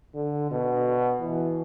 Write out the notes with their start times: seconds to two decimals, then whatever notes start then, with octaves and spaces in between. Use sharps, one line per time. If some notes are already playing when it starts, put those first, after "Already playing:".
0.14 D3
0.51 B2
1.21 E3